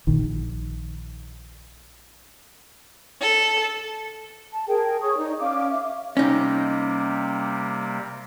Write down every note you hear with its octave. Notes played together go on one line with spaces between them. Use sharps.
A#1 D#3
A4
A5
G#4 A#4 G5
G#4 C#5 C#6 D#6
D#4 D5
C#4 D5 F5 D6
E5 F5
C3 G3 A#3 C#4 D#4